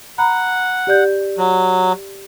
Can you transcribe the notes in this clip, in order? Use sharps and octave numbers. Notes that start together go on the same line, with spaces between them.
F#5 A#5 B5
G4 D5 G6
F#3